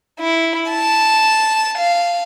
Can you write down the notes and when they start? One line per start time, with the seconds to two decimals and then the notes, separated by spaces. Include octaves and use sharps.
0.20 E4
0.71 A5
1.79 F5